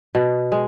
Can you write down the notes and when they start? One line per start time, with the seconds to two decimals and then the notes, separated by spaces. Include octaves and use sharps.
0.15 B2
0.52 G#3